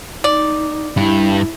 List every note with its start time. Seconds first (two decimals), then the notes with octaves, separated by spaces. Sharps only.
0.24 D#4 D5
0.97 G2 E4